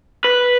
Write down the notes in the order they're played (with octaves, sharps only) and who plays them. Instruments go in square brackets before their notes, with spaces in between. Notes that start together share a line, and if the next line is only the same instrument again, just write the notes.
[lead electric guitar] B4